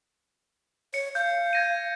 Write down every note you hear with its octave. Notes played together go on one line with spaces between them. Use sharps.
C#5 C#7
F5 G6
G#6 A#6 D#7